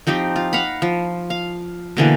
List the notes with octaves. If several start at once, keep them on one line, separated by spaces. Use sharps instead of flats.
F3 C4 D#4 G4
F4
F5 F#5 A#5 B5
F3
F5
B2 D3 E3 A#3